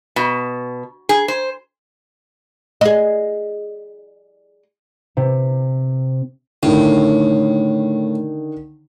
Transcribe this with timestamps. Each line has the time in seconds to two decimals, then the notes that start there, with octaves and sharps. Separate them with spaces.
0.16 B2
1.09 G#4
1.28 C5
2.81 G#4 D#5
5.17 C3
6.63 A2 D3 D#3